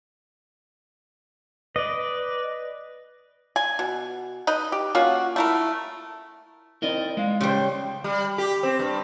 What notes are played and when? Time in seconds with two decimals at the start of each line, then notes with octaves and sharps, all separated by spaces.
1.76 B4 D5 D#5
3.56 G#5
3.79 B2
4.47 D#4 B4 D#5
4.72 G4
4.95 A#3 C#4 F4 F#4
5.36 A3 E4 A#4
6.82 C4 D#4 E4 A#4 D5 D#5
7.17 G#3 F5
7.41 C#3 G3 G4 C5 C6
8.04 G3
8.38 G4
8.63 C4
8.79 G2